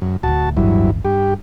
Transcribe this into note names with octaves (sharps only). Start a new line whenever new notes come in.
F#2
D1 D2 F#4 A5
D1 G1 G2 E3 F#3 E4
G2 G4